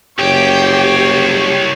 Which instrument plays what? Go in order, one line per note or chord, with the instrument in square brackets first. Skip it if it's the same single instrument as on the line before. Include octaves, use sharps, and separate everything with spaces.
[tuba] F#1 [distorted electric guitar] C2 G5 [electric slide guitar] G4 [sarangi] C#5